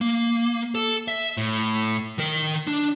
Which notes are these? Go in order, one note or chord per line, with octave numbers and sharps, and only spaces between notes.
A#3
A4
E5
A2
D#3 A#4
D4